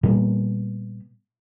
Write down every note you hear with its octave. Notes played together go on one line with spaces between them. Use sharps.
A#2 G3 B3